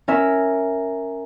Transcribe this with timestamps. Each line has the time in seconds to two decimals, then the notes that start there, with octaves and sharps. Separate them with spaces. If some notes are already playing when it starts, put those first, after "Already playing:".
0.08 C#4 A#4 E5